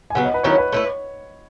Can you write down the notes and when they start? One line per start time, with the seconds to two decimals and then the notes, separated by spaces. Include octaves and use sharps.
0.10 G#5
0.15 C#3 F#3 B3 F#5
0.25 D#5
0.34 B4
0.43 D#3 F#3 C#4 E4 C#5
0.58 B4
0.72 A3 E4 B4 C#5